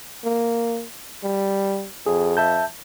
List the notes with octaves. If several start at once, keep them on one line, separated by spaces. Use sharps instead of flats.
A#3
G3
F2 G#4
E5 A5 G6